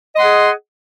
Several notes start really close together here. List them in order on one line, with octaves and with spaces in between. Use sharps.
D#5 C6 F#5 G#4